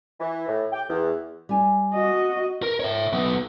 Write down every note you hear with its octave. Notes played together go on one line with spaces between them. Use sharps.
E3
A2
G5
E2
G3 G#5
F#4 D#5
A#4
C#5 E5
F#3 B3